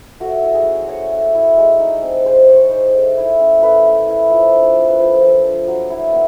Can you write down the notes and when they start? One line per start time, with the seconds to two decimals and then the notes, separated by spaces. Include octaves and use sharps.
0.20 A3 F#4
0.43 E4
0.54 G#4
0.66 C#4
0.88 A3 C#5
1.12 A3
1.35 E4
1.58 G#3
1.80 D#4
2.02 C4
2.25 G#3 C5
2.48 G#3 C#5
2.71 D#4 C5
2.93 A3
3.17 E4
3.39 C#4
3.62 A3 B4
3.85 A3
4.07 E4
4.30 F3
4.53 D4
4.76 A3
4.88 B4
4.99 F3 C5
5.22 F3
5.45 D4
5.67 F#3
5.90 E4
6.12 B3